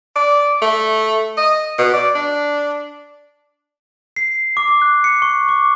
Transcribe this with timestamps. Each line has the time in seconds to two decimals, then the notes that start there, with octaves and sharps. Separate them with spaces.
0.16 D5
0.62 A3
1.37 D#5
1.79 B2
1.94 D5
2.15 D4
4.16 C7
4.57 D6
4.68 D6
4.82 F#6
5.04 C#7
5.22 C#6
5.49 D6